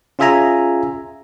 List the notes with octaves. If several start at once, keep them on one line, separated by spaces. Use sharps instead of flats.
C#4 F4 G#4 E5 G#5 A#5